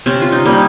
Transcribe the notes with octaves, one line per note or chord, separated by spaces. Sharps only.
C3 C#4
F4
D#4
G3 A#3